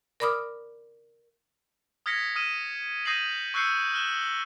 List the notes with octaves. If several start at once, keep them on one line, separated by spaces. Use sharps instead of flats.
A#4 D5 B5 D6 D#6 F6
D#6 F6 G#6 A#6 B6 C#7
D#6 F6 D#7 E7
D#6 G6 A#6 C7 D#7 F#7
C#6 E6 F#6 G6 C7 C#7
F6 F#6 E7
G7